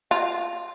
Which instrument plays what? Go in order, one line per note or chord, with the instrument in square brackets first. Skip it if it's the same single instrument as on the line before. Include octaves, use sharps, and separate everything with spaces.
[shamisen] F4